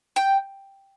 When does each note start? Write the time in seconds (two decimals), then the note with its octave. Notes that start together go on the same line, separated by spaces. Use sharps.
0.16 G5